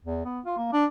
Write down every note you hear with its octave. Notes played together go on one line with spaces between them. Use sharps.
E2
B3
F4
A#3
D4